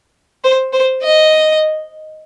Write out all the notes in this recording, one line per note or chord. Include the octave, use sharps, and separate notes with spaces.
C5
C5
D#5